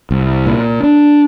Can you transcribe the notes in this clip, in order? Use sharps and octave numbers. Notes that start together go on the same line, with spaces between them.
C2
A#2
D4